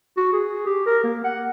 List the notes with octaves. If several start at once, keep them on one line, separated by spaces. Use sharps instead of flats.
F#4
G#4
G4
A#4
A#3
F#5